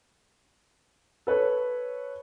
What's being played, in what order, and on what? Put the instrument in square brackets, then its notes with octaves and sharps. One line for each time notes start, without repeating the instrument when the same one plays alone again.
[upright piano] A4 B4 C#5